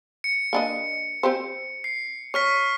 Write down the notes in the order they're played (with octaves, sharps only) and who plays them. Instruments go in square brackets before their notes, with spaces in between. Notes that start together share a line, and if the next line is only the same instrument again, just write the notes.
[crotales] C#7
[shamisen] A#3 D4 D#5
C4 G4 C5
[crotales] C7
[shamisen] C#5 [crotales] C#6 F6 B6